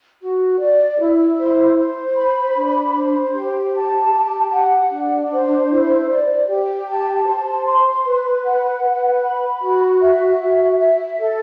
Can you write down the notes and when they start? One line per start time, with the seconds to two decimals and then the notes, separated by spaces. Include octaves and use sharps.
0.21 F#4
0.60 D5
1.00 E4
1.38 C5
1.77 C5
2.16 B5
2.55 D4
2.96 C5
3.34 G4
3.74 A5
4.14 G4
4.52 F#5
4.91 D4
5.31 C5
5.70 E4
6.09 D5
6.49 G4
6.88 A5
7.27 C5
7.66 C6
8.05 B4
8.45 F#5
8.83 B4
9.23 B5
9.62 F#4
10.02 E5
10.41 F#4
10.79 E5
11.19 A4